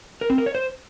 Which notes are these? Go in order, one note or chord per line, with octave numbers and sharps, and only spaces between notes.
A#4
C4
A#4
C#5
C5